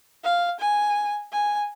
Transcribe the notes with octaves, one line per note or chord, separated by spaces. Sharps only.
F5
G#5
G#5